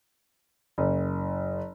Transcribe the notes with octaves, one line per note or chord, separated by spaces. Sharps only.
F#1